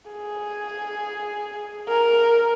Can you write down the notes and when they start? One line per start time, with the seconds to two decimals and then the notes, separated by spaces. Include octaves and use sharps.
0.11 G#4
1.89 A#4